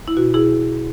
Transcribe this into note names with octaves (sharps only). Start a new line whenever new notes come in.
E4
B2 F#4
E4 G#4